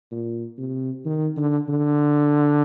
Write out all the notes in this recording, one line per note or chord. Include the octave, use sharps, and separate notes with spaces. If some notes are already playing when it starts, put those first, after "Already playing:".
A#2
C3
D#3
D3
D3